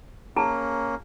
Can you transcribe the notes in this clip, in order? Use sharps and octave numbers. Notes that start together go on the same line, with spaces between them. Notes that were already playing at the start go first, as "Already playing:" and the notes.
A#3 C#4 G#4 A5 A#5